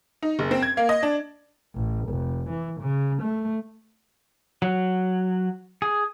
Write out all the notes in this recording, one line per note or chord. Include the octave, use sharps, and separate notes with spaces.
D#4
F#1
C4
G#6
A#3
D#5
D4
A1
F1
E3
C#3
A3
F#3
G#4